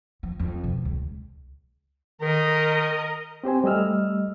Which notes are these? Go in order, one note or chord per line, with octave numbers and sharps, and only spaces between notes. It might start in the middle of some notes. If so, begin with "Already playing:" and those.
F3
F2
B2
C#2
D#3 A#4 D#5
C4 G4 C5 G#5
G3 A3 D#5 E6 F6